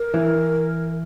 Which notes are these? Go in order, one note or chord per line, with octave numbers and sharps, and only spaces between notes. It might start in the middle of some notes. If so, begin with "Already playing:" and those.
Already playing: A#4
E3